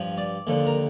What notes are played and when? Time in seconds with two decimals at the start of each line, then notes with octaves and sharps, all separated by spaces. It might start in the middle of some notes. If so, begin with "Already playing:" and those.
Already playing: G2 F3
0.18 D5
0.47 D#2 D3 F3
0.67 A#4